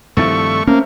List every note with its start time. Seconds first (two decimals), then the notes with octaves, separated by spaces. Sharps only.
0.17 C2 G2 D#3 F3 A3 C4 C#6 A6
0.67 A3 A#3 C4 C#4 A4